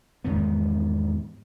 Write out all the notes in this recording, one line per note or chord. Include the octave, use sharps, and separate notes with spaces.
E2 G#2 D#3 B3